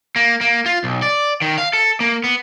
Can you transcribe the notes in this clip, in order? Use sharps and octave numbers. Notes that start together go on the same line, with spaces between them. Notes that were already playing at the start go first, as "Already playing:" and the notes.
A#3
A#3
F4
B1
D5
D#3
F5
A4
A#3
B3